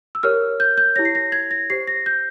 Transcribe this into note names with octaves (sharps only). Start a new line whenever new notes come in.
E6
G4 A#4 C#5 F6
G6
G6
E4 G4 C#5 A#6
C7
A#6
G#6
A#6
G4 C5 C7
A#6
G6